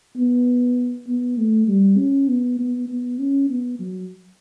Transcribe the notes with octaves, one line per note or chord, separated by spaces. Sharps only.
B3
B3
A3
G3
C#4
B3
B3
B3
C#4
B3
F#3